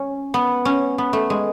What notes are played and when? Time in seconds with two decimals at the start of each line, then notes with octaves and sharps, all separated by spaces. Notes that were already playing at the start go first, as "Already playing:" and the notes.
Already playing: C#4
0.34 B3
0.65 C#4
0.98 B3
1.13 A3
1.30 G#3